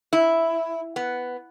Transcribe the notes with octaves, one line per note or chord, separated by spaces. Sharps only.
E4
B3